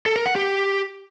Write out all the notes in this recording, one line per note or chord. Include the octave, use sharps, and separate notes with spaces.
A4
A#4
F#5
G4